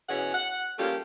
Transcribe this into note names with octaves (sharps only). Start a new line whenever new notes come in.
B2 E3 C#4 G#4 C#5 F#5
F#5
G3 A3 A#3 C#4 F4 G4